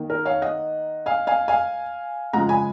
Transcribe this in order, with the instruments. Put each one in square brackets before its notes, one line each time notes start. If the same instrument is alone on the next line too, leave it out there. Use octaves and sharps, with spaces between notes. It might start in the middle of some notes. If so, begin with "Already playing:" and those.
Already playing: [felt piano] D#3 A#3
A#4
C#5 F5
D#5 F#5
F5 G#5
F5 G#5
F5 G#5
C#3 F3 G#3 F#5 A#5
G#5 B5